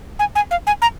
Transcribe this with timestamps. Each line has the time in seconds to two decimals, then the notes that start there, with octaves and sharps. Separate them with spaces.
0.19 G#5
0.35 G#5
0.51 F5
0.67 G#5
0.82 A#5